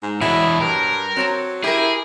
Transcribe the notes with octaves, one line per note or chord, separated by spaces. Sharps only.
G#2
E2 B2 F#3 E4
G2 A#4
F#3 C4 C#5 A5
E4 G4 G#4 A#4